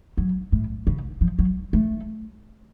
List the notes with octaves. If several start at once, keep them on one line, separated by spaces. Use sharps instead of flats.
F#3
A2
C#3
F3
F#3
A3